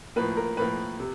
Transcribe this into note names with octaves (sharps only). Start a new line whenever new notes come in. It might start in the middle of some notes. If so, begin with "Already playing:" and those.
A2 F3 A#3 B4
A#4
A2 F3 A#3 B4
C3